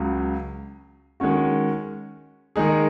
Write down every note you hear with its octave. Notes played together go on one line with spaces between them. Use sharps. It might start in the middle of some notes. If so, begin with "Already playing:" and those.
Already playing: C#2 C#3 F#3
D#3 G#3 C#4 F#4
D#3 G#3 D#4 G#4